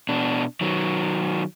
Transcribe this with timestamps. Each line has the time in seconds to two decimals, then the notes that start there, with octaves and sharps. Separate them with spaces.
0.09 B2 D4
0.61 D#3 F#3